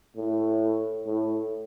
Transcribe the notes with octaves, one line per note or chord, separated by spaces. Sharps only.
A2
A2